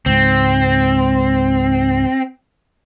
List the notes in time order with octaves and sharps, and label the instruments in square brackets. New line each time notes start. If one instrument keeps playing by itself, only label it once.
[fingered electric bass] C#2 G#2 [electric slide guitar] C4